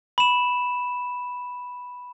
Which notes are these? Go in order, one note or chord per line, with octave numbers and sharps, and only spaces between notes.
B5 E7